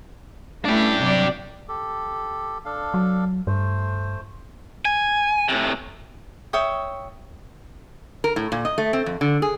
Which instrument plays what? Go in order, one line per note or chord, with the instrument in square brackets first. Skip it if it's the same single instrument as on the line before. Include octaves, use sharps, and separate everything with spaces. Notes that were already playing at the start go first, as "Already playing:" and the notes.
[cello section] A3 C#4 E4 [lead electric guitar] D4 G4
[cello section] C3 F#3 D5
[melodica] G4 A4
D4 A4 F5
[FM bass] F#3
[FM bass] G2 [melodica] A3 C5
[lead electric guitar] G#5
A2 C3
[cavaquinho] C#5 E5 G5 D#6
[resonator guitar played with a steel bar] A#4
A2
A#2
D#5
A3
C4
F2
D3
G#4